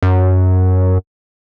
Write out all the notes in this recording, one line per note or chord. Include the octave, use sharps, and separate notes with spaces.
F#2